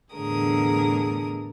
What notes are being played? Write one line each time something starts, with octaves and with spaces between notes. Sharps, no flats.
E2 A2 D3 G#4 A#4 D#6